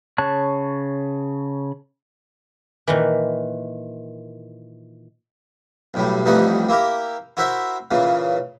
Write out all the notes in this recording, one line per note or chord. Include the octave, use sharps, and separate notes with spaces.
C#3 C#5 A5 F#6
A#2 D#3 E3
B1 A2 G3
A1 F2 E3 G3 D#4 F#5
A#3 E4 G4 A#4
E4 F#4 A#4 C5 E5
A#2 C#3 E3